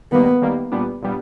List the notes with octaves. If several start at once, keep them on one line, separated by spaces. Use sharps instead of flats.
D#3 G3 A#3 B3
D#3 G3 A#3
A#2 G3 B3 D4
A#2 G3 B3 D4